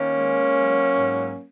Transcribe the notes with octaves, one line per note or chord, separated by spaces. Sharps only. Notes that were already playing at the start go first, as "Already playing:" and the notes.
Already playing: D#3 A#3 C#4
G#3
F#3
G#2